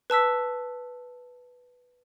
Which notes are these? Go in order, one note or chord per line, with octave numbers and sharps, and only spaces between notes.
B4 A5 E6 B6